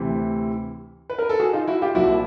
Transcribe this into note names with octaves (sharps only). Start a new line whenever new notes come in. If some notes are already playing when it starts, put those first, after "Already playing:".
Already playing: D2 C3 E3
B4
A#4
A4
F#4 G#4
D#4 F4
E4 F#4
F4 G4
C2 A#2 F3 E4 F#4